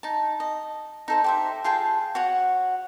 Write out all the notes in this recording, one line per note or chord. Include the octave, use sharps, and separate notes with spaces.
D#4 A5
D#5
D#4 A4 C5
G4 C5 E5
F4 G#4 G5 A5
F#4 C#5 F#5